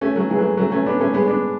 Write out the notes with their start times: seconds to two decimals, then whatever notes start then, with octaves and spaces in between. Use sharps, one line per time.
0.01 A3 C#4
0.16 F#3 A3
0.30 E3 G#3
0.39 F#3 A3
0.57 F#3 A3
0.72 A3 C#4
0.86 B3 D4
1.00 A3 C#4
1.14 G#3 B3
1.28 B3 D4